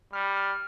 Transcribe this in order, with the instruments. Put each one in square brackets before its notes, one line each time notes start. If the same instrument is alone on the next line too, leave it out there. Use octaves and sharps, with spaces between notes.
[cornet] G3 [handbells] F6
[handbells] F6